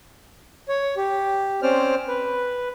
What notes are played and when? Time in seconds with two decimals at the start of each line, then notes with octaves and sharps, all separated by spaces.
0.69 C#5
0.97 G4
1.62 C4 C#4 C5 D5 F6
2.08 B4